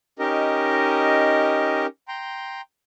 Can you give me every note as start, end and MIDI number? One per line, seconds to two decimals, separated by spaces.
0.19 1.86 61
0.19 1.86 63
0.19 1.86 67
0.19 1.86 70
0.19 1.86 75
2.08 2.61 79
2.08 2.61 82
2.08 2.61 84